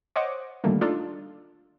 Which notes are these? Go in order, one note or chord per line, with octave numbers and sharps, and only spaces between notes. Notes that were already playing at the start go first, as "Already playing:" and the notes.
C5 C#5 D#5 F#5 C#6 D6
A#2 D3 D#3 G3 A3 A#3
D4 D#4 F4 A4